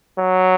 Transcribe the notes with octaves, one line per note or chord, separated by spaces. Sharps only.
F#3